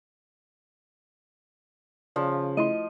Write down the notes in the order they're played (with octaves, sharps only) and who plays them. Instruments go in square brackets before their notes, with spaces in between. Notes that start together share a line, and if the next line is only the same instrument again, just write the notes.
[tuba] C#3 [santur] F3 [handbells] D5
[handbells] A3 E4 C6 [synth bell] D#5